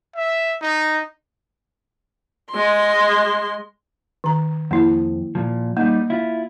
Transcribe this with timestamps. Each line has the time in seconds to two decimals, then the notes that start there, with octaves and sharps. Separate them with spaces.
0.16 E5
0.61 D#4
2.52 G#3 C6
4.24 D#3 A#5
4.71 F2 A#3 E4
5.35 A#2 F3
5.77 G3 A#3 D#4
6.10 E4 F4